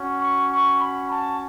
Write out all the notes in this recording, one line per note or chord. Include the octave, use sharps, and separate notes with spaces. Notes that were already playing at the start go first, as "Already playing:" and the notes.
Already playing: C#4 F#4
C#6
C#6
B5
A5